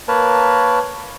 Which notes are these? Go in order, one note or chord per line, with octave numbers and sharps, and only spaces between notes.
A#3 A#4 B4 C#5 A5